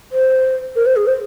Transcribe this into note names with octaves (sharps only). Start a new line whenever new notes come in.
C5
A#4
C5
G#4
C5